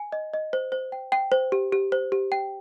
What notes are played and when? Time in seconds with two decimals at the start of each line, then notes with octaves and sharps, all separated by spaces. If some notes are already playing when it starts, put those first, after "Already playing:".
Already playing: G#5
0.12 D#5
0.34 D#5
0.53 C5
0.72 C5
0.92 G5
1.12 G5
1.32 C5
1.52 G4
1.72 G4
1.92 C5
2.12 G4
2.32 G5